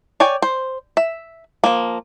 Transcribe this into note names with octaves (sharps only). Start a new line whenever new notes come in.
C#5 D5 G5 G#5
C5
E5
F3 A#3